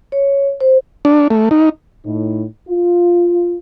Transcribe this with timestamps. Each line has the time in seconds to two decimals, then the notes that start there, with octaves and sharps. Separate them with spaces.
0.12 C#5
0.61 C5
1.05 D4
1.30 A3
1.51 D#4
2.05 A2 D#4
2.68 F4